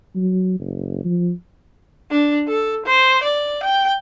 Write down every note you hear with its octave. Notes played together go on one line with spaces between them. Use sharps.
F#3
F#1
F3
D4
A4
C5
D5
G5